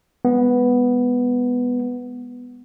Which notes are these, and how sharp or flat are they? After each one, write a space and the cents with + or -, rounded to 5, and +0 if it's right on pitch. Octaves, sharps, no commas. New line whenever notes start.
G#3 -25 B3 +0